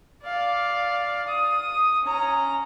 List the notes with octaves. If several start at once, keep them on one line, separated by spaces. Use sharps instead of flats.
D5 F5
D#6
C#4 A#5